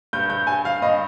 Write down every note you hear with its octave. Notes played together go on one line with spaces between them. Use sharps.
G2 G6
G6
G2 G#5
F5
G2 D#5